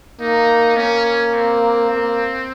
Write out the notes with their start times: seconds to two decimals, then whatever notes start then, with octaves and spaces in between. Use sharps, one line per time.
0.20 A#3 D#4
0.76 A#3 C#4
1.05 C#4
1.34 C4
1.91 A#3